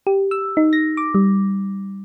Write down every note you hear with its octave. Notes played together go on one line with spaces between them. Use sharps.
G4
E6
D#4
A#6
D6
G3